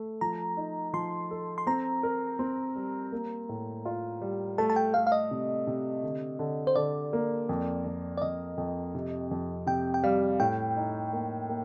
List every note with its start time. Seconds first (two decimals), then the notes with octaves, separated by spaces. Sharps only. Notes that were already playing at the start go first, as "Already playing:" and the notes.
Already playing: A3
0.21 F3 A#5
0.57 D#4
0.93 F3 C6
1.31 A4
1.58 C6
1.67 C4 A#5
2.03 A#4
2.39 C4
2.75 G3
3.12 A#3
3.49 A2
3.85 F4
4.21 G3
4.58 A3 A5
4.70 A5
4.76 G5
4.94 A3 F5
5.07 F5
5.12 D#5
5.31 C3
5.67 C3
6.03 D3
6.39 D3
6.67 C5
6.76 D3 D5
7.13 A#3
7.49 F2
7.86 F2
8.18 D5
8.22 F2 D#5
8.58 F2
8.95 C3
9.31 F2
9.67 C3 G5
9.94 G5
10.03 G3 F5
10.40 A2 G5
10.76 D#4
11.13 A#3
11.49 A#3